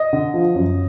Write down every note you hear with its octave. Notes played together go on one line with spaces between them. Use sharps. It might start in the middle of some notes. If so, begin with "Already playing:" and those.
Already playing: D#5
D3
F3
F#2